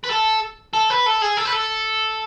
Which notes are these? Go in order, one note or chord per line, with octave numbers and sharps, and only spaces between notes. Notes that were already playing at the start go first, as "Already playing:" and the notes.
B4
A4
A4
B4
A4
G#4
A4
B4
A4